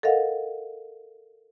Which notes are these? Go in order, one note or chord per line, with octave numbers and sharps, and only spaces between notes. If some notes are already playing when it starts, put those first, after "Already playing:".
A4 A#4 D#5 F5 F#5